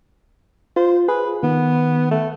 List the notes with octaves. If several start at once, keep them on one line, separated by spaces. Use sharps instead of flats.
F4 C5
G#4 B4
D#3 B3
A3